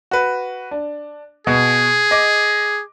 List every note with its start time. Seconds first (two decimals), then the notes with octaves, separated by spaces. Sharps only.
0.11 F#4 B4
0.71 D4
1.47 B2 G#4
2.11 D#5 D6